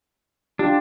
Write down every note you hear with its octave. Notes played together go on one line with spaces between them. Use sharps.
D4 F4 G4